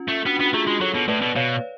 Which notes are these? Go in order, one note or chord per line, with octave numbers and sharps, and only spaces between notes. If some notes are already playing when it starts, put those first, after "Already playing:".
Already playing: C#4 F4
A3
B3 D4 F#4
B3
F#4
A3 F4 G#4
G#3
F#3 A4 C#5
B2
A2 B4 D5
B2
B2 C#5 F5